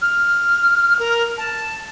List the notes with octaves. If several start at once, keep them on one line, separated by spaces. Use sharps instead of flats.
F6
A#4
A5